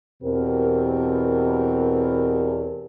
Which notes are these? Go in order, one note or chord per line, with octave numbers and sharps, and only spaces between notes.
E2 B2 C4 G4 A#4